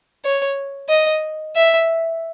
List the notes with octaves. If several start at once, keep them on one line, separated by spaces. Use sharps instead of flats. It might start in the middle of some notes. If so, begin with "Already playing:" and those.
C#5
D#5
E5